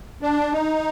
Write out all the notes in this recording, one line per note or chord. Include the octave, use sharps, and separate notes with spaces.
D4
D#4